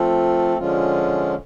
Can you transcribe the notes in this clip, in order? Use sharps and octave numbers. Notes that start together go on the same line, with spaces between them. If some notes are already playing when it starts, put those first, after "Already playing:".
Already playing: F3 A3 C4 F4 A4
D3 F3 G#3 C#4 F4